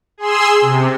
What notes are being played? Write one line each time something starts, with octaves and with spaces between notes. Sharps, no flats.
G#4 C6 E6
C3